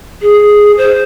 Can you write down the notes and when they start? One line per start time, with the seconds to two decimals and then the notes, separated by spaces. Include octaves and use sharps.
0.22 G#4
0.77 C5